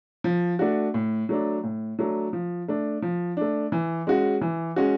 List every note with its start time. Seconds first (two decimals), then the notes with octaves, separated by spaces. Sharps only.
0.24 F3
0.59 A3 D4 F#4
0.94 A2
1.29 F#3 A3 D4
1.64 A2
1.99 F#3 A3 D4
2.33 F3
2.68 A3 D4
3.02 F3
3.37 A3 D4
3.72 E3
4.07 G#3 C#4 F#4
4.41 E3
4.76 G#3 C#4 F#4